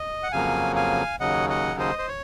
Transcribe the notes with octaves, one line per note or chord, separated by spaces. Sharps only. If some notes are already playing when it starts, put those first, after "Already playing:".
Already playing: D#5
F#5
F2 C#3 F#3 A#3 F5 G#5
F5 G#5
D#2 C#3 F#3 D#5 F#5
D#5 F#5
C5 D#5
C5
C#5